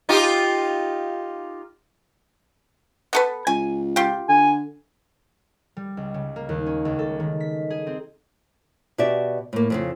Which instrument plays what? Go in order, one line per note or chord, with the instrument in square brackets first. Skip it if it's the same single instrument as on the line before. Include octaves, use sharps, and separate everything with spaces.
[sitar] D#4 F4 G4
[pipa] B3 A4 B4
[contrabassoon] C#2 [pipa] G#5
[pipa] F4 G4
[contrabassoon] D3 [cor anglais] G#5
[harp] G3
C#2
C#3
A#3
D#2
C#4
C#2
A4
D#3
B6
G#4
C4
[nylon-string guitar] B2 F#4 G4 D5 E5
A2 A#3
F2 A2 C#3